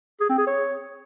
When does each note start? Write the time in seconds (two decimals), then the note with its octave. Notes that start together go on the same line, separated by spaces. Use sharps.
0.21 G#4
0.29 C4
0.38 G#4
0.47 C#5